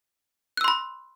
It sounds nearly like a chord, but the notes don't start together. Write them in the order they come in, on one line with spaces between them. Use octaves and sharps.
F#6 E6 C6 B5